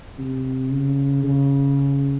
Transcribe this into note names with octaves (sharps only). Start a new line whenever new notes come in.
C3
C#3
C#3